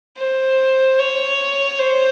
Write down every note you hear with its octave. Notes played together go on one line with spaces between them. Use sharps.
C5
C#5
C5